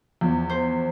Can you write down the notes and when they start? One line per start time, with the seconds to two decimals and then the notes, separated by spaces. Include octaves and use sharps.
0.21 E2 F3
0.49 C5